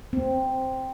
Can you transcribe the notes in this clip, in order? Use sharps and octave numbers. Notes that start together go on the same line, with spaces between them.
C4